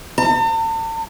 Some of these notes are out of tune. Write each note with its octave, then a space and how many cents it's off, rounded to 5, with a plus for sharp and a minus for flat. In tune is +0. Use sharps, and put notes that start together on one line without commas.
A5 +45